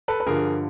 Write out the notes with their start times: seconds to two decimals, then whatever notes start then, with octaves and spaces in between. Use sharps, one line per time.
0.08 A4 B4
0.20 B4
0.26 G2 D3 F3 G#4 A#4